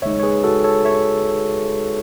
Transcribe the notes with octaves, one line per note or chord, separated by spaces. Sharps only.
D#2 C#3 G#3 D#4 C#5 E5
C#5
G#4 B4
F#4 A4
A4 C#5
C#5 E5